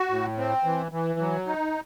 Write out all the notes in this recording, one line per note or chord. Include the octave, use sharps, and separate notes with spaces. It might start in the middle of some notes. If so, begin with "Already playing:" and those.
Already playing: F#4
A2
C4
E3
E3
F#3
D#4